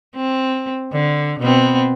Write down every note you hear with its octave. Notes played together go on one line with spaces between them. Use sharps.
C4
D3
B2 B3 C4